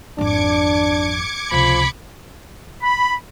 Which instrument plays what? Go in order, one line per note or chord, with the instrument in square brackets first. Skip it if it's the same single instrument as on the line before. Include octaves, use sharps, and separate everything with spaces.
[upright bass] G#1 F2 [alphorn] D4 [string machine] D6 G#6 C#7
[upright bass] C#2 C3 [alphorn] F3 [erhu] B5
[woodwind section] B5